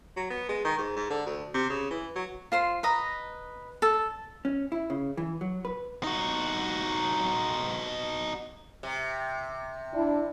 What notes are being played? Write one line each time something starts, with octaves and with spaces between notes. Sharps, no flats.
F#3
B3
G#3
D#3
G#2
G#2
D3
D2
C3
C#3
E3
F#3
F4 C5 C6
B4 D#5 A#5
A4
C#4
E4
C#3
E3
F#3
B4
D#4 F#4
C3
D4 E4